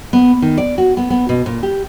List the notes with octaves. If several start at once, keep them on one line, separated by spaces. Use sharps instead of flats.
B3
D#3
D5
F#4
B3
B3
B2
A#2
G4